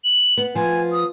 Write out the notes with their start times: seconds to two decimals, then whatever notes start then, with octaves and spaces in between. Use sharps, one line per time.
0.04 F#7
0.37 B3
0.55 F3 B3 G#5
0.92 D#6